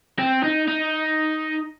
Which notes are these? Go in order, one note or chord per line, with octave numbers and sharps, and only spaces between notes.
C4
D#4
D#4